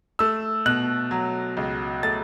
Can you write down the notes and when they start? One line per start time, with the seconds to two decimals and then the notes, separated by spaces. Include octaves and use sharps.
0.19 A3 E6
0.66 B2 F#6
1.11 F#3
1.57 C#2
2.03 A3 A6